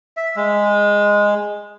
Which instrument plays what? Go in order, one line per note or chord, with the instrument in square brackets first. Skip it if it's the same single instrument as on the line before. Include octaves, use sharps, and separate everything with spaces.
[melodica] E5
G#3